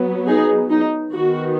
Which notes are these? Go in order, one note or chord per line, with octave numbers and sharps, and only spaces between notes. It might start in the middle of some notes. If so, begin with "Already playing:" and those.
Already playing: F#3 B3
D#4 G#4
D#4
D#3 B3 F#4